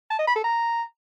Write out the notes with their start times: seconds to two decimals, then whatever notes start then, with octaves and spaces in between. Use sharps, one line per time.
0.10 A5
0.19 D#5
0.27 B5
0.36 A4
0.44 A#5